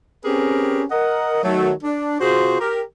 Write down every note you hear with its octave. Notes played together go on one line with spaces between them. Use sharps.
C4 C#4 G4 G#4 A#4 B4
A#4 D#5 F#5
D#3 F#3 A3
D4
C3 F4 F#4 G#4 C5
G4 A#4